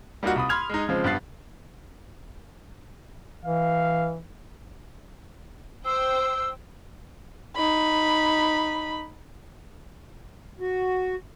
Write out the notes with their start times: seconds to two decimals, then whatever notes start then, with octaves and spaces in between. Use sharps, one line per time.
0.23 G3 A#3 D#4 F4 F#4
0.36 C2 B5 D#6
0.49 B5 C6 F6 G#6 F7
0.70 G#3 D#4
0.88 C#3 F3 G#3 C4
1.04 G2 B3 F#6 A6 C7
3.45 E3 F5
5.85 C5 G5 E6
7.56 D#4 B5
10.60 F#4